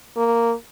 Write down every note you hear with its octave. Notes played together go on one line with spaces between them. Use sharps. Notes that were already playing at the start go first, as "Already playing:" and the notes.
A#3